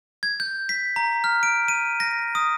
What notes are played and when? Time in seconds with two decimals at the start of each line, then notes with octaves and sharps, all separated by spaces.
0.23 G#6
0.40 G6
0.69 B6
0.96 A#5
1.24 F6
1.43 D7
1.68 D#7
2.00 A#6
2.35 D#6